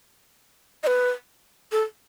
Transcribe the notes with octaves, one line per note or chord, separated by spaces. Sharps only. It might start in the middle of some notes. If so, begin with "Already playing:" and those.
D#5
B4
A4